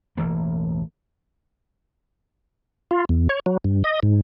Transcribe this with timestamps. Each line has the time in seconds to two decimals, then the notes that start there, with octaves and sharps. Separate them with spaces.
0.17 E1 A1 E3 A#3
2.91 F4
3.09 E2
3.29 C#5
3.46 F#3
3.64 G2
3.84 D#5
4.03 G#2